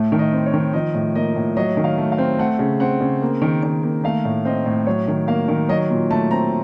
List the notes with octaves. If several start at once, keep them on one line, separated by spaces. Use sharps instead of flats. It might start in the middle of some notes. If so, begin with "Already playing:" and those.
Already playing: A2 A3
D#3
D#5
C4
C#5
D#3
F3 D#5
A2
A#3 D#5
A2
F#3 D#5
D#3
F5
A3
F5
C4
A3 F#5
C#3
C4 F#5
C#3
A#3
D#3
D#3
A#3
A3 F5
A2
C4 D#5
A2
F#3 C#5
D#3
A#3 F5
D#3
F#3 D#5
A#2
A3 A5
C4 A#5